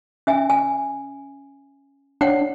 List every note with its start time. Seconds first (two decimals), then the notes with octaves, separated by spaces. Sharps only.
0.27 C#4 E5 G#5
0.50 G#5
2.21 D4 C#5 F#5 G5